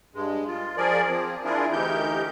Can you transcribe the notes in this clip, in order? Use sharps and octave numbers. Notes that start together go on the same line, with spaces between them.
G2 G#3
F4
F3 G#4 A#4 D5
F3 C4
D4 E4 F4 G#4 A#4
D2 E3 D#4 G4 A#4 G6